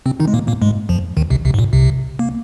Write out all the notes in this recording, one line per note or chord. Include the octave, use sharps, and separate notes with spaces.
C3 C4
D#3 D#4
G#3
A#2 A#3
A#2 A#3
G#2 G#3
F2 F3
D#2 D#3
C2 C3
C2 C3
G#2
A#2
C2 C3
A#3